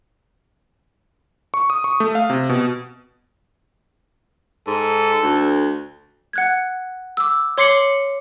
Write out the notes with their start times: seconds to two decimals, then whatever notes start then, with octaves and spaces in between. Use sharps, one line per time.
1.54 C#6
1.70 D#6
1.84 C#6
2.00 A3
2.15 F5
2.30 C3
2.49 B2
4.67 G#2 A4
5.23 D2
6.33 F#5 F#6 G#6
7.17 D6 E6
7.58 C#5 C6 D6 C7 C#7 F#7